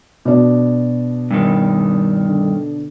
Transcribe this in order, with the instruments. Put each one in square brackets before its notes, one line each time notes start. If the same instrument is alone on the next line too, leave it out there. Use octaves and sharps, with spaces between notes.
[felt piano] B2 D4
[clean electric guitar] G2 D#3
[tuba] D3